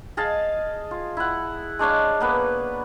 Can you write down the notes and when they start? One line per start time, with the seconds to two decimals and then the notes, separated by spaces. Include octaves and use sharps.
0.17 G#4 D#5 F5 A5
0.91 F4
1.17 E4 F#5
1.79 G#3 D4 C#5 F5
2.20 A#3 B3 B4